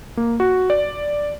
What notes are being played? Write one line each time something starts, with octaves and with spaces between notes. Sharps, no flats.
A#3
F#4
D5